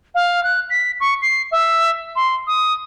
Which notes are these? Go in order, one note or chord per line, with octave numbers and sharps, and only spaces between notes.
F5
F#6
B6
C#6
C7
E5
C6
D#6